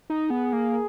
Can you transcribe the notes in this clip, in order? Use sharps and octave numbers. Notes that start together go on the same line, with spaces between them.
D#4
B3 G#4
A#3